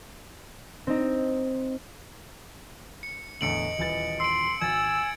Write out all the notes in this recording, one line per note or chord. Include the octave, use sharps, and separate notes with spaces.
C4 D#4
C#7
E2 A2 D3 D#5 C#7 D7 F#7
D#1 E3 A6
C6 E6 D7
G#1 G#5 E6 G#6 A6